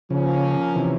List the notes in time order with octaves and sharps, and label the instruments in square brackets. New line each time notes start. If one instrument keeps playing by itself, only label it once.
[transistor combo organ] C#3 [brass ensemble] F3 A#3 C#4
[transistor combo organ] C3 E3